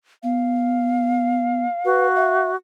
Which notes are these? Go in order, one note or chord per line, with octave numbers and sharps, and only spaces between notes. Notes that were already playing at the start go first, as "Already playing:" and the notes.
B3 F5
F#4 B4
E5